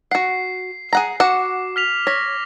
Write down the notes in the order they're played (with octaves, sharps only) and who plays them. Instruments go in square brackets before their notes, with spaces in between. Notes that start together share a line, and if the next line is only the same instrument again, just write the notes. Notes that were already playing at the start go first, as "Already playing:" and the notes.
[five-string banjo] F#4 F#5 [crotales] C7
[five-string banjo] G#4 F#5 A#5
[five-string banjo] F#4 F#5 [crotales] D6
[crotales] F6 B6 F7
[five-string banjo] C#5 [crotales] A#6 B6